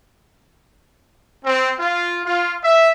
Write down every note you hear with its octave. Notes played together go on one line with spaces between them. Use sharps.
C4
F4
F4
E5